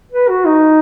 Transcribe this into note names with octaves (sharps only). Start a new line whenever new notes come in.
B4
F#4
D#4